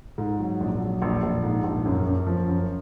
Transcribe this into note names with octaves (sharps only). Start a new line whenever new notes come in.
G#2
F#3
A#1
F#3
A#1
A#1
G#2
A#1
F#2
F#2
F3
F#2